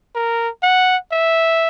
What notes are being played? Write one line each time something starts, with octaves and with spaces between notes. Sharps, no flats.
A#4
F#5
E5